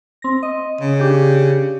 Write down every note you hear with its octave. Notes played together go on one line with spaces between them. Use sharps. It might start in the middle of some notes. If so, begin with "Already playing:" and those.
C4 A#6
D#5
C#3
D4 G4